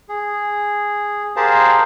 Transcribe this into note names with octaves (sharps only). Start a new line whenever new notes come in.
G#4
G4 G#4 A#4 C5 F5 A5